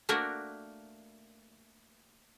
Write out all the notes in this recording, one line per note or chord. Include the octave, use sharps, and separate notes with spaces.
A3 A#3 D4 F#4 A#4